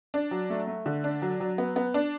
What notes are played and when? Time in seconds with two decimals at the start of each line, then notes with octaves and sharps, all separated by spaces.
0.14 D4
0.31 F#3
0.50 A3
0.68 A3
0.86 D3
1.04 D4
1.22 F#3
1.40 F#3
1.58 B3
1.76 B3
1.94 D4